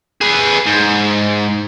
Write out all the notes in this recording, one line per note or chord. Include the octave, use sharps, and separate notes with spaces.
G#4 B4
G#2